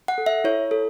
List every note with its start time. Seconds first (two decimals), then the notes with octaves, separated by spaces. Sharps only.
0.08 F#5
0.18 A4
0.26 E5
0.44 E4 C#5
0.71 A4